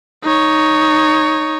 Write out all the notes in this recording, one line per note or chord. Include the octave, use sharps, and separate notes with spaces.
D#4 C#5